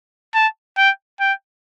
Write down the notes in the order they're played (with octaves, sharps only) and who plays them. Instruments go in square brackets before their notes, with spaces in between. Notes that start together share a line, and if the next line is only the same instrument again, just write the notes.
[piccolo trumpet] A5
G5
G5